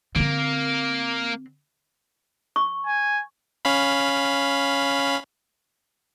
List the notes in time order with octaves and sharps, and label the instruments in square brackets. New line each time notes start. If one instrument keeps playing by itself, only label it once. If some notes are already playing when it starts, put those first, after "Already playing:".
[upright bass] D3 C4 [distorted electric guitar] A#3
[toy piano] C#6
[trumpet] G#5
[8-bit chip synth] C#4 F5 B5